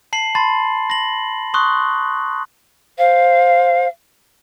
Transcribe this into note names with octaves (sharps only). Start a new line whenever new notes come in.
A5 C7 F#7
A5 B5 C6 A6
A#6 F#7
C6 C#6 D#6 F#6
C5 F5